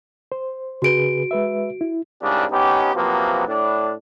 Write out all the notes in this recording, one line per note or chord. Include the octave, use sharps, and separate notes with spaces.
C5
C#3 F#4 G#4 B4 D7
G#3 B4 E5
E4
C2 G#2 C#3 D4 G4
B3 C#4 D#4 G4
C3 F3 F#3 A#3 B3
A2 D4